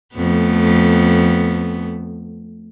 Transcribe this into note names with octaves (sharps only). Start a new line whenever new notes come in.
F2 A3 B3